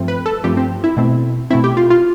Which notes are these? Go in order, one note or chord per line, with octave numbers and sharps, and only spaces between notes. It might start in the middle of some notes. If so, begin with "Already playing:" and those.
Already playing: G2 F3 A3 C4
B4
A4
G2 F3 A3 C4 G4
C4
E4
B2 A3 C4
B2 A3 C4 E4
G4
F4
F4